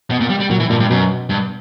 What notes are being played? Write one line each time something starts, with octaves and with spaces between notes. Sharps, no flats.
B2
A#2
G3
G3
A#2 F#3
E3
G2 A#2
G2
F#2 B2
G2